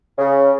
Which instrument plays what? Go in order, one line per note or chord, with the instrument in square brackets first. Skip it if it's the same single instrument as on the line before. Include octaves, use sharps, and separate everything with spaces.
[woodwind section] C#3